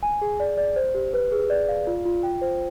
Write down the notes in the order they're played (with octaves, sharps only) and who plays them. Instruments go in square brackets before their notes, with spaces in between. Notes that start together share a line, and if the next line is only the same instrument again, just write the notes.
[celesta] G#5
G#4
D5
D5
C5
G4
B4
G#4
D5
F5
F4
F4
G5
C5